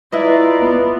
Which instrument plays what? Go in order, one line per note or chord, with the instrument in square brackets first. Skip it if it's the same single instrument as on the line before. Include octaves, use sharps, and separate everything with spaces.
[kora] E4 B4 D#5 [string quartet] F4 D5 A#5
[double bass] B3